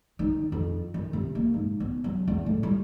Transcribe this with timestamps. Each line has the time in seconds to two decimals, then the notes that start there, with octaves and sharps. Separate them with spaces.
0.19 D#3
0.52 F2
0.94 D#3
1.13 C3
1.35 A#3
1.54 G#2
1.80 B3
2.04 F#3
2.28 E2
2.46 A2
2.63 G3